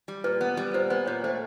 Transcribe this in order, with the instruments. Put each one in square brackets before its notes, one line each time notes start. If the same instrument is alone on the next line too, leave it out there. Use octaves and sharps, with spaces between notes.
[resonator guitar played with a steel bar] G3
[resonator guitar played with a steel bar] A#2 [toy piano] B4
[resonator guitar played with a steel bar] B3
G3
[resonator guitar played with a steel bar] A#2 [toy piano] C5
[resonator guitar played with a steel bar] B3 [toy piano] C5
[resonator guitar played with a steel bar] A#2 [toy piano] C#5
[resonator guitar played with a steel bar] A3 [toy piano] C5